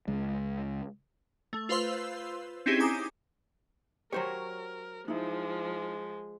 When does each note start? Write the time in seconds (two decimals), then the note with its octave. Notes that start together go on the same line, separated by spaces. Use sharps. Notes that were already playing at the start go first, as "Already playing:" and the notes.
0.08 C#2 G#3
1.53 A3
1.69 F4 B4 C5 F5 C6 E6
2.66 C4 C#4 D#4 E4 G4 G#4
2.80 G#5 A#5 D6 D#6
4.13 F#3 G4 A#4 C5 C#5
5.08 F3 G#3 D#4 E4